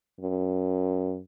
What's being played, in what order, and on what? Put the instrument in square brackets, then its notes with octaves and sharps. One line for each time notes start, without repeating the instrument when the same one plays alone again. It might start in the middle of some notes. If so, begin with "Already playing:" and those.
[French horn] F#2